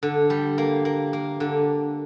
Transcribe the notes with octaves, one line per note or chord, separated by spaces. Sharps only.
D3
G3
A#3
A#3
A#3
D3